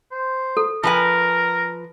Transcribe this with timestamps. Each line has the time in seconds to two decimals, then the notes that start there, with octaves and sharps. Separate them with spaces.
0.12 C5
0.57 A4
0.83 F3 A#4 B4 G#5